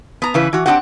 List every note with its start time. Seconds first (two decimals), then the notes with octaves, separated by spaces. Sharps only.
0.22 B3 A#5
0.34 C#3 E3 B4
0.53 E3 F#4
0.66 C4 D4 D#4 F#4 G4 F#5